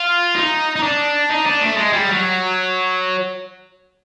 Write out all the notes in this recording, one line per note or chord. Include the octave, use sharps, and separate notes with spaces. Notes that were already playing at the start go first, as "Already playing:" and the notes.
Already playing: F4
D#4
D#4
D4
D#4
D4
A3
G#3
G3
F#3